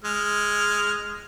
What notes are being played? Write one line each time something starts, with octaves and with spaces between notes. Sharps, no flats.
G#3 F6